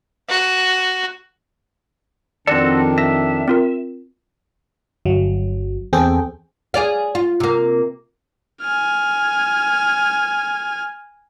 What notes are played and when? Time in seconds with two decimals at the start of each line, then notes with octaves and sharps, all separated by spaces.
0.29 F#4
2.47 F2 D#3 C4 D4 F#4 A4 D5
2.98 E5 A#6
3.48 C4 F4 A#4
5.05 G1 F#3
5.93 E2 C4 G#4 A4 G5
6.74 G#4 D5 F5
7.15 F4
7.40 C3 A#3
8.62 G#5 F6